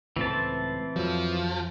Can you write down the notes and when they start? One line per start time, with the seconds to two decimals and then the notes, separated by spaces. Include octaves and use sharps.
0.16 C#2 A2 E3 C4 A5
0.96 F2 F3 F#3